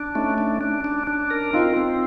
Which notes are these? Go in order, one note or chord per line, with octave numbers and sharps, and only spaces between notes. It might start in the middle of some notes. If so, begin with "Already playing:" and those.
Already playing: D4
A3 C#4 D#4
D4
D4
D4
D4
A#4
C4 D#4 F4
C4